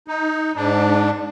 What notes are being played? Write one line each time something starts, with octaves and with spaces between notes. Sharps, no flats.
D#4
G#2 D4